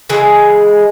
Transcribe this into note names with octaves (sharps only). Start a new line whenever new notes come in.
C#3 E3 G#3